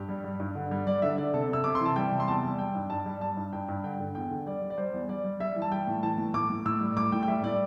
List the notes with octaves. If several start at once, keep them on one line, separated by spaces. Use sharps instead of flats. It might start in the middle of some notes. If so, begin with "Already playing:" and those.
Already playing: G2 G4
G3
G3
G2
D3
G3
G3 D5
D3 E5
D3 D5
C3 A4
C3 E6
C3 D6
C6
E3 A5
G3 G5
C3
C6
E2 A5
G3
G3 G5
G2
G2 A5
G3
G3 A5
G2
G2 G5
G2
D3 G5
D3
E2 G5
D3
G3 D5
G3
D5
G3 C5
E2
G3 D5
G3
G3 E5
E3
A5
G3 G5
A2
E3 A5
A2
A2 D6
A2
A2 E6
G3
A2 D6
A2 G5
G5
G3 E5
A2 D5